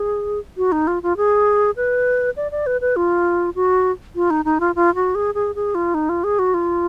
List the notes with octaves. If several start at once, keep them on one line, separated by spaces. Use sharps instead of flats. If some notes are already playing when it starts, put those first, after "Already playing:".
Already playing: G#4
F#4
D#4
F4
F4
G#4
B4
D5
D5
B4
B4
F4
F#4
F4
D#4
D#4
F4
F4
F#4
G#4
G#4
G#4
F4
D#4
F4
G#4
F#4
F4